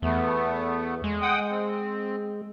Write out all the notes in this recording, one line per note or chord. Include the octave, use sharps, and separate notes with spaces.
E2 A3 B3
G#3
F#5 G5 D#6
C4